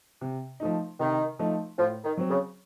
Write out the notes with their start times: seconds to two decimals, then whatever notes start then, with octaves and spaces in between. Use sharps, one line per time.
0.21 C3
0.60 F3 A3 D#4
0.99 C3 D#3
1.39 F3 A3 D#4
1.78 A2 F3
2.04 D#3
2.17 F#3 C4
2.30 C#3